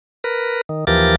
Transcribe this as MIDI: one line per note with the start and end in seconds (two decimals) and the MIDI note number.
0.24 0.61 70
0.24 0.61 71
0.69 0.85 51
0.87 1.16 39
0.87 1.16 52
0.87 1.16 53
0.87 1.16 67
0.87 1.16 70
0.87 1.16 93